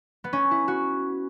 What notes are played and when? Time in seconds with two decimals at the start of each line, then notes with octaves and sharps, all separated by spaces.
0.24 B3
0.33 C#4
0.51 E4
0.68 F#4